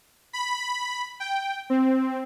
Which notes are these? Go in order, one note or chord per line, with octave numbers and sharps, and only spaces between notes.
B5
G5
C4